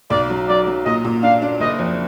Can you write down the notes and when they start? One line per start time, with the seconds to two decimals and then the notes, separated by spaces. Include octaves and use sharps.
0.10 B1 D5
0.30 F#3
0.48 F#3 D5
0.67 F#3
0.85 A#2 D#5
1.05 A#2
1.23 D4 F5
1.42 D4
1.60 F#1 D#5
1.79 F2